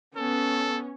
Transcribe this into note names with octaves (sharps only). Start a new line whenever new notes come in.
B3 C#4 A4